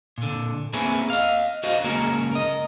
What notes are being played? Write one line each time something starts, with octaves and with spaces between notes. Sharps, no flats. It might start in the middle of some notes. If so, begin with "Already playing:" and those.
A#2 D3
A#3 C4 C#4 E4 G#4 B4
D#5 F5
F#4 C5 D#5 F5
C#2 A#3 C#4 G#4 A#4
A#4 D#5